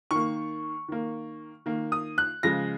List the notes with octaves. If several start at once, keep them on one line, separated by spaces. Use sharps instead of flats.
D#3 A#3 C#6
D#3 A#3
D#3 A#3
D#6
F#6
C#3 F3 G#3 A#6